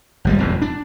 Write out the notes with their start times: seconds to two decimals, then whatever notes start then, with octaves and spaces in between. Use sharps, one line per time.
0.25 G#1 G3 G#3
0.38 E1 F2 A2 C3
0.62 D4